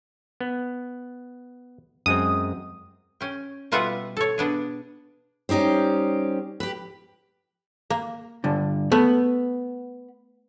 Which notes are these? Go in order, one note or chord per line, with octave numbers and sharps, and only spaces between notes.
B3
F#2 G#3 C4 D#6
C#4 G5
B2 G3 F4 B4 E5 F#5
A4 C#5
B3 D4 G#4
G3 C#4 D#4 G4 C5
G4 B4
A#3
G2 D3
A3 B3